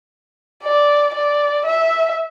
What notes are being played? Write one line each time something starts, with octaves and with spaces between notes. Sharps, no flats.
D5
D5
E5